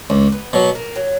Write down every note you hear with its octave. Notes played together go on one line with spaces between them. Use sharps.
C#2 A#3
B3
B2 F#3 A#3
A#3
F#3